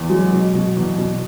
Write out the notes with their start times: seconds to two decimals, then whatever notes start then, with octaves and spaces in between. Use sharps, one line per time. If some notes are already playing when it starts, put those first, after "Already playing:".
Already playing: E2
0.10 F#3 G#3
0.32 B2
0.54 B2
0.77 E2
0.98 B2